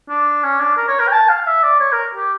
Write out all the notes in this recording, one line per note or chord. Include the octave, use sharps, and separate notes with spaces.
D4
C#4
D4
A#4
C#5
A#4
G5
A5
F5
E5
D5
C#5
A#4
G4